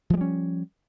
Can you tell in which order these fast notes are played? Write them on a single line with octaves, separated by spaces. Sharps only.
F3 G#3 G3 C#4